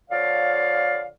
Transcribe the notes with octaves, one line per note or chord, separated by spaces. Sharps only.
D3 F3 C#5 D5 F5